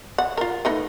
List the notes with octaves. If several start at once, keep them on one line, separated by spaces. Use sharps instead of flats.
F#5
F4 A#4
A3 D#4 B4